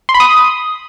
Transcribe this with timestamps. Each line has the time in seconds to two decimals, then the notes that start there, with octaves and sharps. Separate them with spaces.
0.09 C6
0.14 B5
0.20 D#6